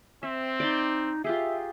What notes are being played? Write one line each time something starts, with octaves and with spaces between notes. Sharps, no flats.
C4 E5
D#4 D5 B5 C6
F4 G4 G#4 E5